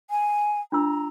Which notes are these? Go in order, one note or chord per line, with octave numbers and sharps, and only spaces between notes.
G#5
D4 F4 A#5 E6